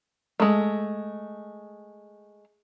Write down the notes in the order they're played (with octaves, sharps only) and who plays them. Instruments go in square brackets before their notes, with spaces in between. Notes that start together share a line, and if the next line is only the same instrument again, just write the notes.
[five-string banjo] G#3 A3